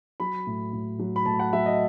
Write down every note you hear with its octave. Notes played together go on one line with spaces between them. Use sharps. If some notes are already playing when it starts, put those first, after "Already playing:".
F#3 B5
A2
A2
F#3
B5
A2 A5
F#5
F#3 E5
D#5